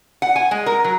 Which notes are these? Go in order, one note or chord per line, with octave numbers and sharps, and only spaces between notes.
F#5
G#5
G#3
A#4
F#3